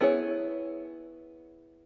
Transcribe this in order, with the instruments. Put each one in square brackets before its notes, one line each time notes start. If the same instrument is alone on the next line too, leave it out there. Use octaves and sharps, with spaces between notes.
[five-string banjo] B3 E4 G#4 C#5